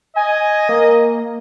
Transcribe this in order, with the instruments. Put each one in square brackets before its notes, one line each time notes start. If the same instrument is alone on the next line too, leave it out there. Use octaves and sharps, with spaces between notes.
[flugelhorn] D#5 [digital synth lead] G#5
[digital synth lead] A#3